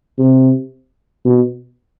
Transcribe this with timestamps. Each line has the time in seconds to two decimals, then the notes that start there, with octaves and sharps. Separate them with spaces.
0.19 C3
1.25 B2